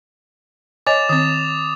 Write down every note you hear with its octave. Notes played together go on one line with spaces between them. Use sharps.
C#5 D#5 G#5 D6 A6 F7
D#3 C4 D#6 A6